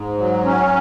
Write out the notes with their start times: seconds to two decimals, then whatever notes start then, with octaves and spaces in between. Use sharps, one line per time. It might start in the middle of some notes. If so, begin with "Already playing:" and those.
Already playing: G#2
0.18 F#3
0.45 C#4